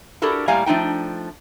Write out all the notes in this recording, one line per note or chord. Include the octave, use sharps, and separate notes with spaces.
D4 E4 F#4 G4 A4 A#4
A2 G3 A#3 F5 G#5 A#5
F3 A3 D4 D#4 G5